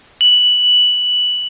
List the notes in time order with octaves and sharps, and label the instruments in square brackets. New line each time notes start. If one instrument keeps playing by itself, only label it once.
[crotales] F#7